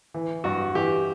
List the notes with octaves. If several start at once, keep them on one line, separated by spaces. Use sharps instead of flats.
E3
G2 F#4
E3 G4